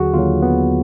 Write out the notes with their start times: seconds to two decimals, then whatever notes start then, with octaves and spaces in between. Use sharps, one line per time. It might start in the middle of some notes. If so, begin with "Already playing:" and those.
Already playing: D#2 D3 F#3 F#4 G#4
0.14 D#2 D3 F#3 F4
0.42 B3